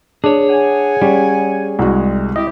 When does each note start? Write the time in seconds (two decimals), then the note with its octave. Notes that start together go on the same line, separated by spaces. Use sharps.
0.24 D4 G#4 C#5
0.49 F#5 G#5
1.02 G3 C#4
1.79 C2 G#3 F#4
2.36 C4 E4 G4 D#5